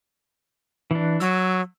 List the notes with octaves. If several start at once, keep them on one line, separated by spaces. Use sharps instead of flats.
E3 D4
F#3 E6